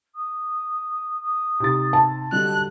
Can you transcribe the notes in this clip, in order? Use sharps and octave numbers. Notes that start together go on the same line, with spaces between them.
D#6
D#6
C3 D#4 A6
A5
D3 F#3 G3 D#5 F#6